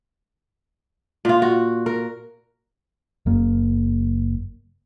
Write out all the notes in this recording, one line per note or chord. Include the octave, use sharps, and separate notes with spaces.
A#2 F4
F#4
A#4
F#1 F#2 A#3